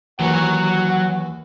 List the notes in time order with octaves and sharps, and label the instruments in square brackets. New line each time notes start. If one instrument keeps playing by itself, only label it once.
[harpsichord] D#2 E3 [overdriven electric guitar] F#3 C#5 [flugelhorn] F#5